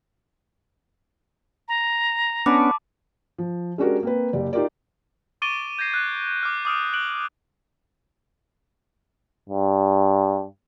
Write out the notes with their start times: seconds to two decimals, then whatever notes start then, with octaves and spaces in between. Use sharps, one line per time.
1.68 A#5
2.46 B3 C#4 D4 A5 B5 D6
3.38 F3
3.78 G#3 C#4 D4 F#4 G4 A#4
4.03 A#3 C4 B4
4.33 F#1 G4 D5
4.53 D#4 F4 G4 A#4 D5
5.42 C#6 D6 A6 D7 D#7 G7
5.79 G6 G#6 A#6 C7
5.94 F#6
6.43 D6 F6
6.65 D6 D#6 F6 D7
6.93 F#6 D7 F#7
9.49 G2